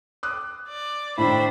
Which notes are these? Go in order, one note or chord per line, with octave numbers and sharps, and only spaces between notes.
D6 D#6 F#6
D5
A2 D#3 D4 E4 C5 B5